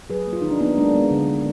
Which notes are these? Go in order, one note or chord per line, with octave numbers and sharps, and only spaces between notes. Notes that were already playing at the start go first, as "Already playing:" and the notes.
F#3 G#4 B4
A#3
F4
D#3 D#4
D4
A#3 B3 D#4
G#3 A#3 D4
G#3 B3
D3
D3